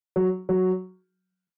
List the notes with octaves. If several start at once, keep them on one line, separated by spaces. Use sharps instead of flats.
F#3
F#3